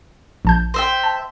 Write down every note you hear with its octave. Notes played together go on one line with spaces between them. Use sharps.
A#1 A5 G6
C5 E5 G5
A5